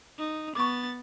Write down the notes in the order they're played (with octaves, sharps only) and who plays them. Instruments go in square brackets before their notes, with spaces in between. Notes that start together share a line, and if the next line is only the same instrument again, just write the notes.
[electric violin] D#4
[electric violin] B3 A6 [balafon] C#6 D6